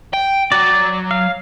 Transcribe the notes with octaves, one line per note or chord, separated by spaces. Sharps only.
G5
F#3 D5
F5